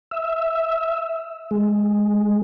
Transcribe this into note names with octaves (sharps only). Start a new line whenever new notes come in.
E5
G#3